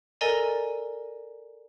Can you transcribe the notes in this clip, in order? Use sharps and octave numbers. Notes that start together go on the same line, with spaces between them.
A4 A#4 D5 D#5 G#5 A#5